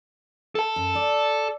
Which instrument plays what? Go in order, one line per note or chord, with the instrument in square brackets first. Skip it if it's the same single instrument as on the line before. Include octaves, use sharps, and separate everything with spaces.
[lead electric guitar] A4 A5
[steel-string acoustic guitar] F#2
D5